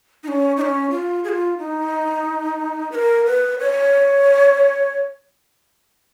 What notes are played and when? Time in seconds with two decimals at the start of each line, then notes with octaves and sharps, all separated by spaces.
0.23 D#4
0.28 C#4
0.57 D#4
0.61 C#4
0.90 F4
1.24 G#4
1.29 F4
1.58 D#4
2.92 B4
2.95 A#4
3.26 B4
3.59 C#5